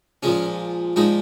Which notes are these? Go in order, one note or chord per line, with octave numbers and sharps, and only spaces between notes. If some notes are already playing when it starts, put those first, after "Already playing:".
A#2 F3 G#3 C#4
A#2 F3 G#3 D#4